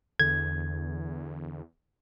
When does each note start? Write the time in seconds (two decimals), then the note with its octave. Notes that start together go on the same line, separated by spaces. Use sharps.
0.20 E2 D3 G#6